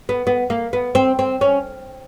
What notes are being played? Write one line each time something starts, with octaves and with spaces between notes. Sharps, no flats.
B3
B3
A#3
B3
C4
C4
C#4